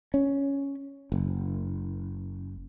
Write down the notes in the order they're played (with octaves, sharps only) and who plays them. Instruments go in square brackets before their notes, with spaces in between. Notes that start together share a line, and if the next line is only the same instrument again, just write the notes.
[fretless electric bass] C#4
F#1